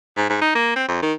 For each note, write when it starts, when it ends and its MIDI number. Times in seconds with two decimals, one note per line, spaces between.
0.18 0.25 44
0.29 0.38 44
0.42 0.51 63
0.55 0.72 58
0.76 0.88 60
0.88 1.02 41
1.02 1.14 51